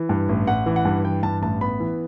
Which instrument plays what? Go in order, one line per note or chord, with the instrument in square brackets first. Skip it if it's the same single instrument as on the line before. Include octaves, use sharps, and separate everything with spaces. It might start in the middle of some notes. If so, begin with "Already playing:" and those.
Already playing: [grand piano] E3
G2
A1
A1 F#5
E3
F#5
G2
E3 G5
G2 A5
A1 A5
B3 B5
E3